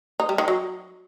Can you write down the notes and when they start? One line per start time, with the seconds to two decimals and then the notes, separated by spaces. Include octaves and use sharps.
0.20 D#4
0.29 G3
0.38 D#3
0.48 F#3